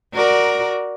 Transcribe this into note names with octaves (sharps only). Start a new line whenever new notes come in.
F#4 A#4 D5